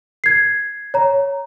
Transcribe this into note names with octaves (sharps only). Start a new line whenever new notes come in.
G#6 C7
C#5 A#5